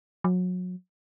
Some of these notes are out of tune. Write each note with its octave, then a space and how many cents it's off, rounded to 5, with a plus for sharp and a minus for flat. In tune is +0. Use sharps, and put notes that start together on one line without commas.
F#3 -30